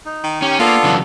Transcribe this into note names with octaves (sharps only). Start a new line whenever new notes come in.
D#4
D#3
C#4 G4
A#3 B3 D4 F4 A4
C#3 E3 F#3